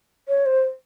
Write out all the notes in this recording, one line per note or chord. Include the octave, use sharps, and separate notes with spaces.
C#5
C5